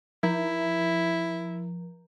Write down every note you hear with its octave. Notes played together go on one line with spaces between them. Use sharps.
F3 E4